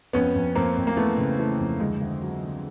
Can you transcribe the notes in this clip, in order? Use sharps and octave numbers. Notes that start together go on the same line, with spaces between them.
F2 B3 C#4
F2
F2 A#3 C4
F2
A#3
E3 A3 B3
C#3
E3 A3
F2
D2 G#3
D2
F#3
D3